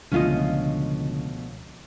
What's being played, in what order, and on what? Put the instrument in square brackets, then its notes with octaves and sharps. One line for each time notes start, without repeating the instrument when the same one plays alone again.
[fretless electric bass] C#2 D3 [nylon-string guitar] B2 F3 A3 [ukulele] C#4 F4 D#5